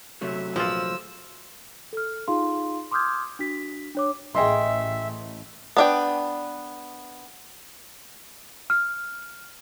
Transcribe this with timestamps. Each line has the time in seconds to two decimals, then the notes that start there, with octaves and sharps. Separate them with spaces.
0.21 C3 F#3 A3 E5
0.56 A#1 E3 F3 F4 E6
1.93 A4 F6
2.28 D#4 F4 G#4 F5 C6
2.91 C6 D6 D#6 F6 G6 G#6
3.39 D4 F#4 B6
3.95 D4 C#5 D6
4.35 A1 A3 G#4 D#5 E5 G5 C6
5.77 B3 D4 G5
8.70 F6